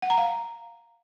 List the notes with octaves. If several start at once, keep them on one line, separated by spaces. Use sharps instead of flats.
F#5
A#5
F5